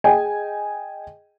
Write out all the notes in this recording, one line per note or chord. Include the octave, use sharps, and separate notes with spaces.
G#4 D#5 G5 G#5